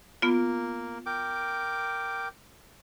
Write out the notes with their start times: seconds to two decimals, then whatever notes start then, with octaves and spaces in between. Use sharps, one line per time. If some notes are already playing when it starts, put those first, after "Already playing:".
0.22 A#3 B3 F4
1.06 A#4 G5 D6